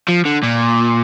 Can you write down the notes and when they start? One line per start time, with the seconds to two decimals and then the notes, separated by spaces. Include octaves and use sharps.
0.09 F3
0.26 D3
0.43 A#2